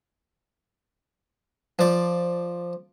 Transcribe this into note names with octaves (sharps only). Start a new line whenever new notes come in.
F3 D5